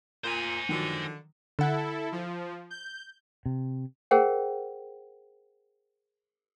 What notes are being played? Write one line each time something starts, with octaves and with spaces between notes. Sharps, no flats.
A#2 C5 G#5
D3 D#3 F3 F#3
D3 E4 A4 F#5 F#6
F3
G6
C3
G#4 A#4 C5 F#5 G5